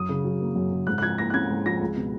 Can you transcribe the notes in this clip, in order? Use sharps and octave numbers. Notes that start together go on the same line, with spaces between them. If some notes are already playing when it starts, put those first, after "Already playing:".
Already playing: F#2 D#6
C#3
F#3
A#3
F#2
C#3
G#2 F#6
F#6
F3 G#6
A#3 A#6
F#6
C#4 G#6
G#2
F3 A#6
C#2
B2